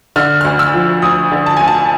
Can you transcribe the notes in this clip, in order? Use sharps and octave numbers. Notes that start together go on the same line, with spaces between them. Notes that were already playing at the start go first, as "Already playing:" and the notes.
D3 F6
F6
D2
E6
F3
D2 D#6
D3
A5
D2 G#5
A5